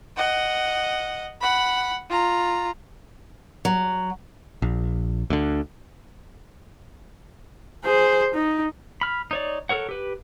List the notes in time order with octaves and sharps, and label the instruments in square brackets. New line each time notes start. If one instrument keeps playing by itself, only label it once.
[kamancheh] D#5 F#5
F#5 B5
F4 A#5
[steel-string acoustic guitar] F#3
[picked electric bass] A#1
D2 D3
[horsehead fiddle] G#4 C5
D#4
[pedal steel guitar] B5 F6
D#4 C#5 D5
A4 A#4 C#5 F#5
G4 B4